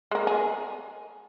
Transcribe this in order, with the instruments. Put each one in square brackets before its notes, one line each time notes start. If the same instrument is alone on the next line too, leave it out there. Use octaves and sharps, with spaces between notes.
[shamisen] G#3 A#4
G#4